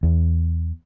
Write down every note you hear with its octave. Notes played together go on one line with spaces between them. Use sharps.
E2